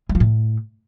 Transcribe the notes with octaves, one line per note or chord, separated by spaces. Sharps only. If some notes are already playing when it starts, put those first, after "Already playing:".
G#3
F3
A2